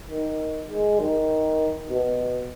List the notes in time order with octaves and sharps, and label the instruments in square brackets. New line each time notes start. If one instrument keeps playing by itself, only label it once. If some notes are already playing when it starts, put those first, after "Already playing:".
[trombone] D#3
G#3
D#3
B2